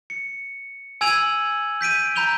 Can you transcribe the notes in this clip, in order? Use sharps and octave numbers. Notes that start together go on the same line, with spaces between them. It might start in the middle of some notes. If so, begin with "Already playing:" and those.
C#7
G#5 E6 G#6 D#7 F7 F#7
G6 B6 D7 D#7
A#5 B5 G6 F7 G7